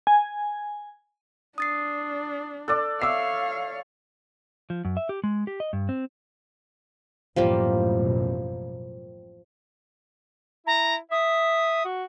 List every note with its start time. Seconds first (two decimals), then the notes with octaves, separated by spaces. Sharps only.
0.07 G#5
1.58 D4 D#6 A6 C7
2.68 A4 D5 D6 F#6
3.02 C#5 E5 F5 D6 E6 C7
4.70 F3
4.85 F#2
4.97 E5
5.09 G4
5.24 G#3
5.47 G4
5.60 D#5
5.73 G2
5.89 C4
7.36 A1 F#2 B2 F3 G3 A#3
10.66 E4 A#5
11.11 E5 D#6
11.85 F#4